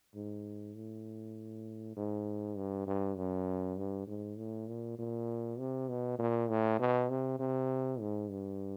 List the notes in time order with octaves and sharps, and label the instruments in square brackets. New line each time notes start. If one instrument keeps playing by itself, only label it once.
[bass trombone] G#2
A2
G#2
G2
G2
F#2
G2
G#2
A2
A#2
A#2
C3
B2
A#2
A2
B2
C3
C3
G#2
G2